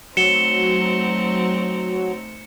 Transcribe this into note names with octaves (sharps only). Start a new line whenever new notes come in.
F#3 A3 C4 D#4 C#7 E7 G7